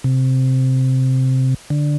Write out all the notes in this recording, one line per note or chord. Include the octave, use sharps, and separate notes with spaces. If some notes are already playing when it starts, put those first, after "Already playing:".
C3
D3